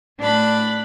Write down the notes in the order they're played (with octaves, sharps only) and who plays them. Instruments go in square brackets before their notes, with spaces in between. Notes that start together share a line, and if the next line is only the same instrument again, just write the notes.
[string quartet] A2 D4 A5 B5 F#6